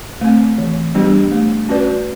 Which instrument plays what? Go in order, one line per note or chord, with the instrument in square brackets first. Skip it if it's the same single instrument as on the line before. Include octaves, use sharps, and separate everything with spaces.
[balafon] A3 C4
E3
G3 B3 D4 G4
A3
C#4 F#4 B4 D5